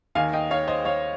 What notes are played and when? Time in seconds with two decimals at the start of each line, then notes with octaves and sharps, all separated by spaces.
0.15 D#2 D#3 F5 G#5
0.33 D#5 G5
0.51 C#5 F5
0.67 C5 D#5
0.85 C#5 F5